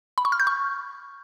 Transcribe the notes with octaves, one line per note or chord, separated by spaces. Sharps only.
B5
C#6
F6
G6
C#6